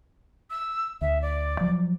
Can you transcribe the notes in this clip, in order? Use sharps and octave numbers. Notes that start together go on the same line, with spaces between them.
E6
D2 E5
D5
F3 F#3